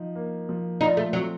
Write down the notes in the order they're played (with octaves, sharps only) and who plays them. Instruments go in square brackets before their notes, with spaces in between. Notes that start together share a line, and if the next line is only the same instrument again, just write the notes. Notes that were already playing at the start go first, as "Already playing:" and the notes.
Already playing: [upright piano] F3 D#4
A#3
F3
[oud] D#4 [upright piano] F4
[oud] A3
[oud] F#3 [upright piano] C4